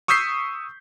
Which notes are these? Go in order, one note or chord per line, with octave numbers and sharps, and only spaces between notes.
C#6 D#6 E6 G6 B6 C7